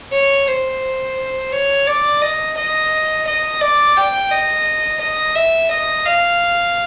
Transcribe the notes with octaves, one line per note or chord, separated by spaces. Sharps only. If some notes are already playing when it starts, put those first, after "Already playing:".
C#5
C5
C#5
D5
D#5
D#5
D#5
D5
G5
D#5
D#5
E5
D#5
F5